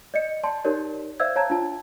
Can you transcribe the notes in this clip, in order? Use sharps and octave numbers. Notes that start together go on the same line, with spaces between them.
D5 D#5 C#7
D5 A5 C6
D#4 G4 A#4 C#5 D5
C5 D5 E5 F5 E6 G#6
C#5 F5 A5 A#5 G#6
D4 F4 A5